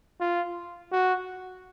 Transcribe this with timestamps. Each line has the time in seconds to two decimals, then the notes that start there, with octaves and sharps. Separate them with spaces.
0.20 F4
0.92 F#4